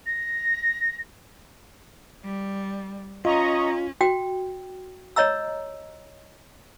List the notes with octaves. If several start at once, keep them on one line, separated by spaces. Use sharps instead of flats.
A#6
G3
C#4 F4 D#5 A#5 C#6
F#4 G5
C#5 D#5 A#5 E6